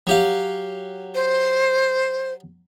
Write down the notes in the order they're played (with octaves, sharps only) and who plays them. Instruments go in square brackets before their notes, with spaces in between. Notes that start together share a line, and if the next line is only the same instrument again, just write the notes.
[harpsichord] F#3 G4 F5
[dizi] C5